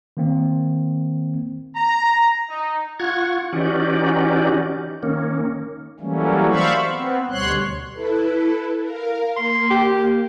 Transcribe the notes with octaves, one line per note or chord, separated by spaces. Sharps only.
D#3 A#3 C4
A#5
D#4
F4 F#5 C#6 G#6
E3 C#4 D#4 F#4 G4 D5
D#3 A#3 C#4
E3 F#3 G3 A3 A#3 C#4
C5 D5 E5 F5 B5 C#6
B3 C4
D2 B2 G3 C#5 C6 F#6
E4 A4 B4
A#4 F5
A#3 C6
G4